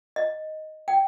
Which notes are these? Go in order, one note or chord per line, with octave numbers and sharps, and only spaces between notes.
D#5
G5